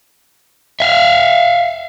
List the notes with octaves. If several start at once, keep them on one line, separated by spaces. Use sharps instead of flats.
E5 F5